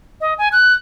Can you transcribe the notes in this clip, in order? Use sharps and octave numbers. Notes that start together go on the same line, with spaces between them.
D#5
G#5
F#6